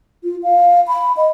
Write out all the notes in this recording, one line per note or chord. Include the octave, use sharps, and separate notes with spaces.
F4
F5
B5
D#5